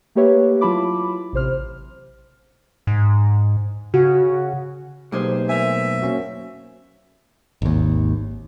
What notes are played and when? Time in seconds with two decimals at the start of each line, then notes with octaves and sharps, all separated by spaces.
0.15 A3 A#3 G4 B4 C#5 E5
0.61 F#3 E4 F4 A5 B5 D6
1.33 A1 C3 C5 F6
2.87 G#2
3.94 C#3 F#4
5.12 B1 A3 A#3 D#4 G4 G#4 C5
5.49 A#4 E5 G#5
6.02 A#3 C#4 F#4
7.62 G#1 D#2